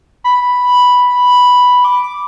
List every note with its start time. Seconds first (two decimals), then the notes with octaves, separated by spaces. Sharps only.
0.24 B5
1.84 D6